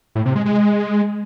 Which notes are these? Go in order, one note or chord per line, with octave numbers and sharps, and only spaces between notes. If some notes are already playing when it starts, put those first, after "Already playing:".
A2
C3
G#3
G#3